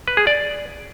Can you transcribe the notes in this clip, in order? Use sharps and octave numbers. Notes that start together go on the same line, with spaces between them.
B4
G#4
D5